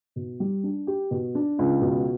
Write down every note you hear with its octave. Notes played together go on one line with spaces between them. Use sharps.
B2
G3
D4
G4
B2
D4
C#2
B2